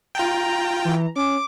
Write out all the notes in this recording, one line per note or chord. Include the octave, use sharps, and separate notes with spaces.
F4 G5 A#5
E3
C#4 D6